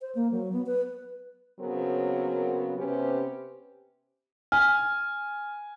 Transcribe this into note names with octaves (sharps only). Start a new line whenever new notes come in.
C5
A#3
F#3
B3
B4
C#3 F#3 B3 C4 G#4 A#4
C3 B3 C#4 G4 B4 C5
G#5 F6